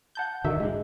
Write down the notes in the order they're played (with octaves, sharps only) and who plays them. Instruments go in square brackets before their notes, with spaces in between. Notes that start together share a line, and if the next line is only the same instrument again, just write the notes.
[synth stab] F#5 A5 G6
[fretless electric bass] D3 D#3 [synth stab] F#3 D#4 E5
[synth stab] G#2 D4 [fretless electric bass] G#3